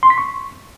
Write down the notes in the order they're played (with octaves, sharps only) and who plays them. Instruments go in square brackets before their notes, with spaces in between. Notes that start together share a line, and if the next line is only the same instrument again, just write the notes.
[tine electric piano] C6
B6
C#6